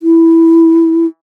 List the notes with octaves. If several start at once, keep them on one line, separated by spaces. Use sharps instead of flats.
E4